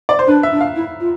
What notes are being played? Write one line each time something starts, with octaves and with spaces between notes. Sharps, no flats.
D5
C5
D4 B4
E5
D4
F5
E4
F4